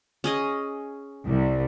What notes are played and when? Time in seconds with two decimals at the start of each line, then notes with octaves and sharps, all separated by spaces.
0.24 C#4 G#4 D#5
1.27 C2